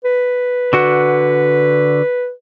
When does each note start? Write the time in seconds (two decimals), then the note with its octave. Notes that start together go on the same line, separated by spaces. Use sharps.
0.05 B4
0.73 D3 F#4 F#5